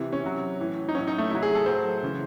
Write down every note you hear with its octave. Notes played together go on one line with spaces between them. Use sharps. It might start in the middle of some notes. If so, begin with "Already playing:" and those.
Already playing: C3 E3
C#4
C3 F#3
A2 E3
D#4
A2 F#3 C#4
D#4
A3
C3 F#3 E4
G#4
A4
A2 F#3 C5
C#3 E3